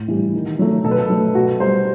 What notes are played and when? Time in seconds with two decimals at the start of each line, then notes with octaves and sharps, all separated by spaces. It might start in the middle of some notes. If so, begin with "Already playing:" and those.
Already playing: A2
0.08 E3 G3
0.34 D#3
0.59 F#3 A3
0.84 B2 A4
0.91 B4
0.98 A4
1.10 F#3 A3
1.35 B2 F#4
1.60 G3 C5